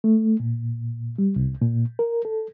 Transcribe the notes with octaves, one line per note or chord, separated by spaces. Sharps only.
A3
A#2
G3
C2
A#2
A#4
A4